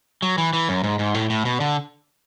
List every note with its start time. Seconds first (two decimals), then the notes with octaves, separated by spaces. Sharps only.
0.22 F#3
0.38 E3
0.53 E3
0.69 F#2
0.84 G#2
0.99 G#2
1.14 A2
1.30 A2
1.45 B2
1.60 D3